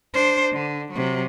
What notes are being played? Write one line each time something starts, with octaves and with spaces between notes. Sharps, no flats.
D4 C5
D3
C3 F#3